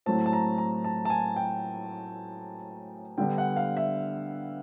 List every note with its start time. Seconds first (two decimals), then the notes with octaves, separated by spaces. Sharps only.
0.06 A2 F#3 A3 C4 A5
0.26 A5
0.33 A#5
0.58 A#5
0.84 A5
1.05 A5
1.10 G#5
1.36 G5
3.18 D3 G3 B3 D4 G5
3.38 F#5
3.56 F5
3.77 E5